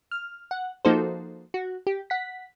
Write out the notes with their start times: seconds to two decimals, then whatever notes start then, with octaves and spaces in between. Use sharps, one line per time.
0.11 F6
0.51 F#5
0.85 F3 A#3 D#4 F#4 A4 C5
1.54 F#4
1.87 G4
2.10 F#5 B6